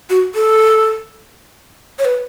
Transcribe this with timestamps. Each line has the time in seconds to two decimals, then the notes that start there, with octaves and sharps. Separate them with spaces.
0.10 F#4
0.35 A4
1.99 C#5
2.05 B4